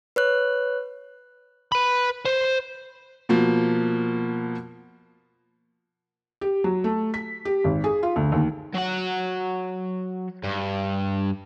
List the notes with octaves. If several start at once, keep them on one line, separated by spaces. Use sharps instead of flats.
B4 C#5 F#6
B4 B5
C5
B2 F3 A#3
G4
F#3
A3
B6
G4
G#1
G#4
F4
D2
D#2
F#3 F#5
G2